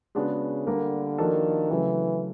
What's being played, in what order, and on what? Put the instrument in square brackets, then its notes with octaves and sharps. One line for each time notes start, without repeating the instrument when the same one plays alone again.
[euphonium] C#3 [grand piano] G#3 B3 D4 F#4
[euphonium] D3 [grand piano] G3 A#3 D4 G4 A#4
[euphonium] D#3 [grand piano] F3 A#3 D4 F#4 A4
[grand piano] C#3 F#3 A3 [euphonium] E3